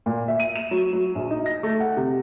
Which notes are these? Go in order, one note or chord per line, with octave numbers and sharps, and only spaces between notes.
A#2
E5
D#7
E7
F#3
F#3
A#1
D#4
A#6
A3
F#5
C3